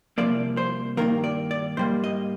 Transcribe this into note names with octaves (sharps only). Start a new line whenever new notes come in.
C2 A#2 F3 A#3 D5
C5
G2 D#3 A#3 A#4
D5
D5
G#2 G3 A#3 C5
D#5